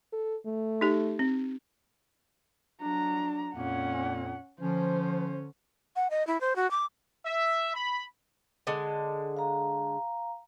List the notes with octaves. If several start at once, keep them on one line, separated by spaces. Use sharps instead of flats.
A4
A3
D#4 G4
C4
F#3 D4 A#5
F2 A#2 A#3 C#4 F#5
D3 F3 C#4 C5
F#5
D#5
E4
C5
F#4
D6
E5
B5
D3 G#3
F5 A#5